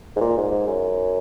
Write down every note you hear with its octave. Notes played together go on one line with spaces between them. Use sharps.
G#2
A#2
G#2
G#2
F#2